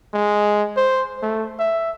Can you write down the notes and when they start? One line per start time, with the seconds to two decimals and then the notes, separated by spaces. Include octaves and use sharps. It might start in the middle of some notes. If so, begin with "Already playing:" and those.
0.13 G#3
0.77 C5
1.22 A3
1.59 E5